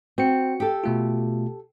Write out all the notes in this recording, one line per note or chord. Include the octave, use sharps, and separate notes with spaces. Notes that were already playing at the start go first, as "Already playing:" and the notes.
C4 F#4 C#7
G4 A4
B2 A3 F4